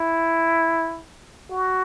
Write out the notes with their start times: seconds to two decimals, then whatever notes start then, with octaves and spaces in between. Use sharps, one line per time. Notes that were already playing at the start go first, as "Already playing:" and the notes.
Already playing: E4
1.51 F#4